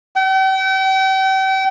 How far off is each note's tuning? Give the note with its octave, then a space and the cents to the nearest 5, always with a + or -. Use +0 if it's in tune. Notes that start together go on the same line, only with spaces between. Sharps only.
G5 -40